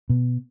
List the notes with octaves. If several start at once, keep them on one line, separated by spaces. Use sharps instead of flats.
B2